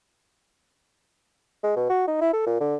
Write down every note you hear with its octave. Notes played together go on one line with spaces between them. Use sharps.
G#3
B2
F#4
D#4
E4
A4
A#2
D3